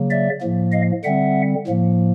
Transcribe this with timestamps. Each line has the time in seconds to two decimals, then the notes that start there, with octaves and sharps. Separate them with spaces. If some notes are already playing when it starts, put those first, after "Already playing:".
Already playing: C#3 F#3 A#3
0.10 D5 E5
0.41 A2 F3 A#3
0.72 D#5 F5
1.04 D3 G3 C4 E5 F#5
1.67 A2 F3 A#3